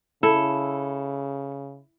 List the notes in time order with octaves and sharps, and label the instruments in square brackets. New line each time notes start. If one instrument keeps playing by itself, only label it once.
[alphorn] C#3 [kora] E4 [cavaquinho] A4